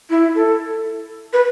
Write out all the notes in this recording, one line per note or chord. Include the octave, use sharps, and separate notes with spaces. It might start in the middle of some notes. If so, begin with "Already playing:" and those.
E4
A4
B4